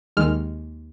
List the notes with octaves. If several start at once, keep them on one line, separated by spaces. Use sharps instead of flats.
D#2 D#3 G#3 F6